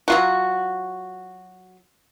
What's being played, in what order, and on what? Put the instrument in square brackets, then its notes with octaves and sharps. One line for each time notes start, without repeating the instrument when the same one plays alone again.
[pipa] F#3 F4 F#4